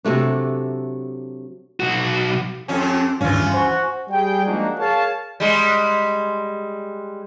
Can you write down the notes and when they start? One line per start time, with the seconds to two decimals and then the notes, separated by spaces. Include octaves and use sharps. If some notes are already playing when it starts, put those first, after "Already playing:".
0.05 C3 F#3 A3 D4
1.80 B1 F#4
2.68 F2 C#4 F4 G4 A4
3.21 G#1 D2 G2 E3 C#4 F4
3.54 F#4 C5
4.10 G3 G#4 G5
4.45 F3 G#3 A#3 D4 D#4 F#4
4.79 G#4 A#4 C#5 F5 A5
5.40 G3 G#3